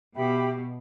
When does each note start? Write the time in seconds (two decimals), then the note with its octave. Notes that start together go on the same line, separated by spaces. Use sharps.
0.15 B2 G4 E5 G5 B5